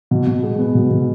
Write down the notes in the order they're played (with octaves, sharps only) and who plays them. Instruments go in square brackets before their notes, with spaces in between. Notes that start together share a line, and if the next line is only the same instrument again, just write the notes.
[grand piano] B2
B2
G#3
B3
B2
B2